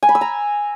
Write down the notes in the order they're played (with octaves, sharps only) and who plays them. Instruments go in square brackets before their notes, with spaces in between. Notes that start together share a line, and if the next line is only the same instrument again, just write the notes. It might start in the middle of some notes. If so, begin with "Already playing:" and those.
[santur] G#5
B5
E6
A#5